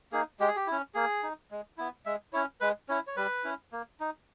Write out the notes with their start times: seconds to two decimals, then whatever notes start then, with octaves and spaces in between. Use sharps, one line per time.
0.12 A#3 D#4 G#4
0.40 G#3 G4
0.48 G#4
0.56 G4
0.67 C#4 E4
0.95 A#3 G#4
1.23 D#4
1.51 G#3
1.78 B3 E4
2.06 G#3 E5
2.33 C#4 E4 C#5
2.61 G#3 B4
2.89 C#4 E4 C#5
3.07 C#5
3.17 G3 B4
3.44 C#4 E4
3.72 A#3
4.00 D#4